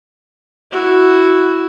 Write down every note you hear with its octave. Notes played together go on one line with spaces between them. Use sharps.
E4 F#4